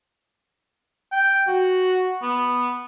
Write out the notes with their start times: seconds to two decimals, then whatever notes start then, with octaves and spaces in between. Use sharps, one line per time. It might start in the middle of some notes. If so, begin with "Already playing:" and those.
1.12 G5
1.47 F#4
2.22 B3